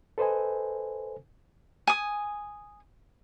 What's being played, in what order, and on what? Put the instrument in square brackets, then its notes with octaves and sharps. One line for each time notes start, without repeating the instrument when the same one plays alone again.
[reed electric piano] A4 B4 C5 D#5 G#5
[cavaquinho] G#5 D#6